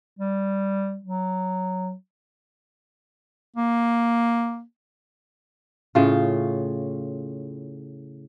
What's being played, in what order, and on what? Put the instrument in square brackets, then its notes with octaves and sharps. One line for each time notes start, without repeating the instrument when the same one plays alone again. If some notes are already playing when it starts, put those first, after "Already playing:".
[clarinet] G3
F#3
[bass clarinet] A#3
[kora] A2 C#3 F4